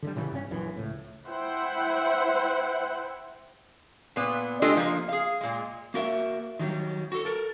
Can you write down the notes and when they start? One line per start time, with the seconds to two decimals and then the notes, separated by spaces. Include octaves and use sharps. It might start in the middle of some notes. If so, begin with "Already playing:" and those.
0.02 D3 D#3 G3
0.16 A#2 C#3 E3 G3
0.31 G2 C#4
0.51 A#1 F#2 E3
0.76 C#2 A2
1.26 E4 C5 E5 F#5 G5
4.16 A#2 B3
4.62 G#3 D4 F4 G4 A4 D#5
4.77 F3 A#3
5.09 G#4 F5
5.41 A#2 G#3
5.94 A#3 F#4 A#4 E5
6.59 D#3 F#3 G3
7.12 F#4 A4
7.25 A4 A#4